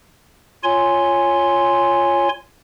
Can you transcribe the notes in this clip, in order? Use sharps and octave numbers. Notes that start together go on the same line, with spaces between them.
F4 C#5 G#5 C6